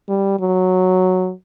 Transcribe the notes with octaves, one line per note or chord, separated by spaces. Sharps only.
G3
F#3